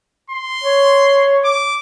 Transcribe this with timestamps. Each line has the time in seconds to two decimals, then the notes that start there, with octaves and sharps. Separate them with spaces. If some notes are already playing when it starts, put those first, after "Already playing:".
0.30 C6
0.64 C#5
1.45 D6